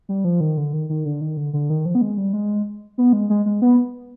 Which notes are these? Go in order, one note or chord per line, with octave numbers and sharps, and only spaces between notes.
G3
F3
D#3
D3
D#3
D#3
D3
D#3
D3
D3
D#3
F3
B3
G#3
G3
G#3
B3
G#3
G#3
G#3
B3